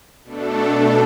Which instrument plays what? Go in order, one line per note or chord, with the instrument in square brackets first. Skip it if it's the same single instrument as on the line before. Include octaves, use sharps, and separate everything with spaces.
[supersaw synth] B2 A3 D4 A4